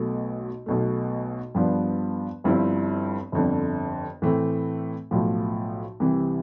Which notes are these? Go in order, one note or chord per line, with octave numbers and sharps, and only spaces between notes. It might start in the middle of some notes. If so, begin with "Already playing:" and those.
Already playing: B1 B2 A3
B1 B2 A3
G2 F3 B3 D4
G1 G2 F3 C4 E4
G1 F2 D3
A2 E3 A3 C4
B1 A2 F3
C2 C3 E3